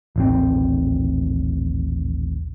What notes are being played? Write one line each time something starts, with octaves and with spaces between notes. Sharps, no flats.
D#1 A1 C4